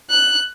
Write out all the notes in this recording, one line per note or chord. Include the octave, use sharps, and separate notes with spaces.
F#6